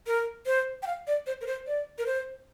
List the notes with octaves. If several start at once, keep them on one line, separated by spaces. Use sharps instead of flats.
A#4
C5
G5
F5
D5
C5
A#4
C5
D5
A#4
C5